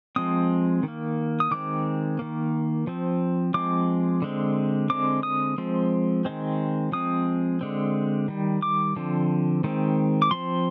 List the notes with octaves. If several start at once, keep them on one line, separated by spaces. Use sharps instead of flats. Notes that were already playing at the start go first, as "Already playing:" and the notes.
F3 G#3 C4 D#6
D#3
A#3
D#6
D#3 G#3 C4 D6
D#3 A#3
F3 C4
F3 G#3 C4 D6
D3 G#3 C4
D3 G#3 C4 D6
D#6
F3 G#3 C4
D#3 G#3 C4
F3 G#3 C4 D#6
D3 G#3 C4
D#3 G3
D6
D3 F3 C4
D#3 G#3 C4
D6
F3 C4 C6